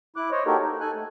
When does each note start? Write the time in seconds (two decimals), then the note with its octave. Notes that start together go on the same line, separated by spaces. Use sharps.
0.16 E4 D6 F#6
0.31 C5 C#5 D#5
0.46 A#3 D#4 F#4 G4 A4 A#4
0.62 D#4
0.80 A4 G#5 F#6
0.95 A3